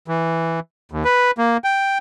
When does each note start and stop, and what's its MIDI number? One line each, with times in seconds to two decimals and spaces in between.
0.08 0.60 52
0.92 1.04 39
1.05 1.31 71
1.38 1.57 58
1.64 1.98 79